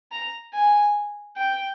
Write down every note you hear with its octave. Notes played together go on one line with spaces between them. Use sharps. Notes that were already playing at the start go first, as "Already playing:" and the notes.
A#5
G#5
G5